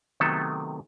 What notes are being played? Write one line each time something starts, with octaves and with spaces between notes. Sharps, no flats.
C3 D#3 F#3 A3 B3 A4